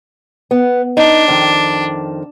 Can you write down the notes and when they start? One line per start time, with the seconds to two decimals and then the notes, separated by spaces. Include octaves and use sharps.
0.51 B3
0.97 D4 D#4
1.28 F2 D#3